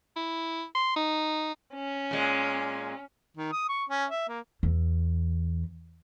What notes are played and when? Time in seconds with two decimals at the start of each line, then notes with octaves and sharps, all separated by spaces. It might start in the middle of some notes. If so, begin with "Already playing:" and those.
0.16 E4
0.75 C6
0.96 D#4
1.74 C#4
2.11 A#2 G#3
3.37 D#3
3.52 D#6
3.69 C#6
3.89 C#4
4.10 E5
4.29 A#3
4.63 E2